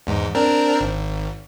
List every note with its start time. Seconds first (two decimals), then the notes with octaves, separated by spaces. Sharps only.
0.07 E2 G#2
0.35 C4 D4 A#4
0.80 G#1